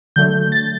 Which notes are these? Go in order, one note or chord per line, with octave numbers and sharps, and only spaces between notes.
D3 F#3 A3 G6
A6